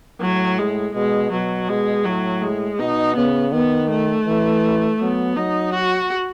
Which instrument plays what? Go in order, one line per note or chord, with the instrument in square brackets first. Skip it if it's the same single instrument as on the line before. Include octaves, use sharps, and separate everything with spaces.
[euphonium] A2 [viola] F#3
[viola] G#3
[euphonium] B2 [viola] G#3
[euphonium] B2 [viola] F#3
[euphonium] B2 [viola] G#3
[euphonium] A2 [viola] F#3
[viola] G#3
[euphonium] B2 [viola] D#4
[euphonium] C#3 [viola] B3
[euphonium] D#3 [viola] B3
[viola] A3
[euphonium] E3
[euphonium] F#3 [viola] B3
[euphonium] F#3 [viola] D#4
[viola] F#4